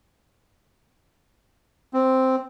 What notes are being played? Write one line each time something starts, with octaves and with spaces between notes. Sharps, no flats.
C4